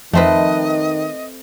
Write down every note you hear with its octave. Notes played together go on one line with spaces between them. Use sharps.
F2 D#3 A3 C4 B4 D#5